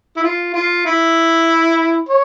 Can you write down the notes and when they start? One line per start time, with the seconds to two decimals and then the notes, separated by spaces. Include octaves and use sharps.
0.16 E4
0.23 F4
0.54 F4
0.86 E4
2.09 C#5